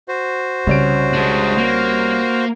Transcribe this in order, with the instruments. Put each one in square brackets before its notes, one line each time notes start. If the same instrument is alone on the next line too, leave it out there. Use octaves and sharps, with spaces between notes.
[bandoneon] F#4 C5
[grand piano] C2 C#4 D7 [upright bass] C#3
[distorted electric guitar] G#3 D4
A#3